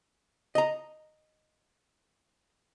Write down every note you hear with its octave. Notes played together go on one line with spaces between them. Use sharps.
D#5 A#5